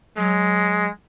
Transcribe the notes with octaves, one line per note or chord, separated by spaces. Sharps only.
F#3 G#3